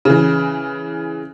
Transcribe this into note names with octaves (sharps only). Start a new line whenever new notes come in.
C#3 E3